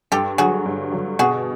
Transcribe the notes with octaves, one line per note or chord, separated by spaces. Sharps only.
G2 G4 A4
D3 F#3 F#4 G#4
G2
D3 F#3
B2 F#4 G#4